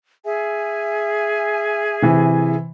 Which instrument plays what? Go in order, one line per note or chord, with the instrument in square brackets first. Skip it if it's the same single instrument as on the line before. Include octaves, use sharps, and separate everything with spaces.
[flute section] G#4 E5 G#5
[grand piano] C3 E3